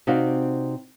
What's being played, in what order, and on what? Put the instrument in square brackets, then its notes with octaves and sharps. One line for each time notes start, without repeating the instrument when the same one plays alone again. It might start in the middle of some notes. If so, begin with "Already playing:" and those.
[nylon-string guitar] C3 C4 D#4 F#4 D5 F5